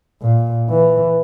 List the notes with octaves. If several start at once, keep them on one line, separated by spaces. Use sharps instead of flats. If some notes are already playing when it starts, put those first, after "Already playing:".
A#2
E3